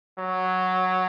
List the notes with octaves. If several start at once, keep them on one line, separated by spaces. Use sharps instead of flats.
F#3